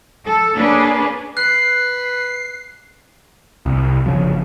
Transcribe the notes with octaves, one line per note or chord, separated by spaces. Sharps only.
A4
A#3 C#4 D4 G#4 B4
B4 F#6 C7
C2
G1 C#3 F3